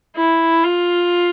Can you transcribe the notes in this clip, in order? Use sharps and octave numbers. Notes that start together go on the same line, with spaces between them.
E4
F4